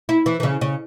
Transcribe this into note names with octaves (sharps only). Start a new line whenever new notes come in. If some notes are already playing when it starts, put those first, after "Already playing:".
E4
E3
E3
C#3
C#3